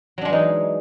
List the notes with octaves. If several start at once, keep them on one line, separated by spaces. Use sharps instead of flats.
E3 F#3 G#3 D4 D#4